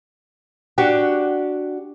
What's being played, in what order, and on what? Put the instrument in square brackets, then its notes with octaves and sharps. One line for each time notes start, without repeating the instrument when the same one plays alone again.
[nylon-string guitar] D4 F#4 G4